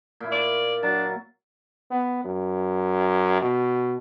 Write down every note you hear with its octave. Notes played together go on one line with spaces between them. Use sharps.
A#2 E4
D5
F#3 D4 A6
B3
F#2
B2